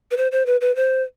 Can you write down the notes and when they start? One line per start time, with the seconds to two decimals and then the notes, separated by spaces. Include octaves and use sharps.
0.11 B4
0.17 C5
0.32 C5
0.46 B4
0.61 B4
0.76 C5